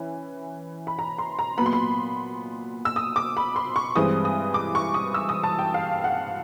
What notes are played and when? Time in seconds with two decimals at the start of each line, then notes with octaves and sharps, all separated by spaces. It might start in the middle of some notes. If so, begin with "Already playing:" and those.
Already playing: E3 C#4
0.87 B5
0.99 A#5
1.18 C6
1.39 A#5
1.58 A#2 F#3 B3 B5
1.66 C6
1.73 B5
2.85 E6
2.96 D#6
3.16 D6
3.37 B5
3.56 C6
3.76 C#6
3.96 G2 E3 G#3 C4 D#6
4.25 D#6
4.54 D6
4.75 C#6
4.94 D#6
5.14 E6
5.29 D#6
5.43 A5
5.59 G5
5.74 F5
6.04 F#5